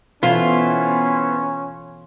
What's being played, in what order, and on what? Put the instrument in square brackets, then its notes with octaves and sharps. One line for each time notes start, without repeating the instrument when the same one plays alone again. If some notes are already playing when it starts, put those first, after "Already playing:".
[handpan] B2 E3 A4 [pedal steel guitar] B3 E4 C5 [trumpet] C#4 [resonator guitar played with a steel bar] F4